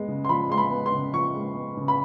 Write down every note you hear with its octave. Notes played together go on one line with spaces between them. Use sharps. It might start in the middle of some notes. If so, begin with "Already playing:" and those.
Already playing: G#3 B3
C#3
C6
F3 B5
G#3 C6
B5
B3
C6
C#3
F3 C#6
G#3
B3
C#3
B5